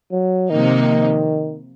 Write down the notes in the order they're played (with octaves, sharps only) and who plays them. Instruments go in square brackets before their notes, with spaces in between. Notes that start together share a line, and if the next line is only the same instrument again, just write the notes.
[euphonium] F#3
[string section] C3 F3 A#3 D#4 [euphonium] D#3